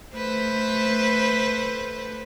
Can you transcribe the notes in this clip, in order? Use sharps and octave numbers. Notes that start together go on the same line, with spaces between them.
A3 B4 C5